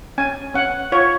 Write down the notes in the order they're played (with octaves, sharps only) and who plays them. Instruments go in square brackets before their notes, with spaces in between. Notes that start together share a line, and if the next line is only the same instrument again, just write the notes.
[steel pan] C#4 G#5
C#4 F#5
F4 C#5